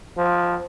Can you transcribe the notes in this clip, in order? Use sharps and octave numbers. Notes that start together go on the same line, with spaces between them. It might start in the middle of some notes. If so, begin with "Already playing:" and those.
F3